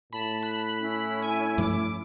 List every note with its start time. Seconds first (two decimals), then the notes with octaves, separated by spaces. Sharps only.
0.13 A2 A5 B5
0.43 B5 F#6
0.79 C#4 E4
1.22 G#5
1.58 G2 F3 A3 D6